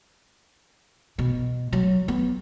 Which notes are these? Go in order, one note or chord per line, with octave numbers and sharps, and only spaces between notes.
B2
F#3
B3